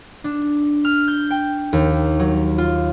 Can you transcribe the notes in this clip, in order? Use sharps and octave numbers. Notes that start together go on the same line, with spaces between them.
D4
F6
G6
G5
D#2
F#3
F4